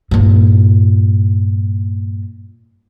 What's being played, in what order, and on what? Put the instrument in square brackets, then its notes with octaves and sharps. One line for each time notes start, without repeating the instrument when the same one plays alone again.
[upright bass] G2 A#2